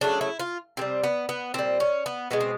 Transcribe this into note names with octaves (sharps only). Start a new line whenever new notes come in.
C#3 F#3 A3 D4
E4
F4
C3 E3 G3 C4
B3
B3
A#2 G3 C4
C#4
B3
B2 G#3 B3
C4